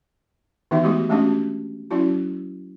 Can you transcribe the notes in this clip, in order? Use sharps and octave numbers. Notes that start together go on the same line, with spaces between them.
D#3 E3 B3 D#4 F#4 E5
G#3 A3 B3 D#4 F#4 G4
G#3 A3 C#4 D4 F#4 G4
F#3 C#4 E4 F#4